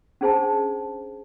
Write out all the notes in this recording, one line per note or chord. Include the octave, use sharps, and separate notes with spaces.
C#4 D4 G#4 C5 G#5 A5